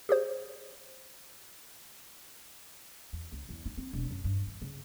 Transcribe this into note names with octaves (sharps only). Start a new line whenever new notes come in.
G4 G#4 C5
E2
C#2
E2
D#4
C4
E1
F#2
G2
D#3
C#3